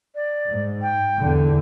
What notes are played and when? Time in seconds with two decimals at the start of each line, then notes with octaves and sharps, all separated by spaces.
0.15 D5
0.49 G#2
0.82 G5
1.18 E2 D3